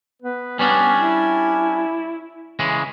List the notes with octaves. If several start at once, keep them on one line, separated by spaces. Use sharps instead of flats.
B3 B4
G3 B3 C#4 D4 G#5
E4
C#3 E3 G#3